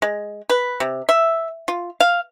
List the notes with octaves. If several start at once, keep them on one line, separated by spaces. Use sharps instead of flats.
G#3
B4
C3
E5
F4
F5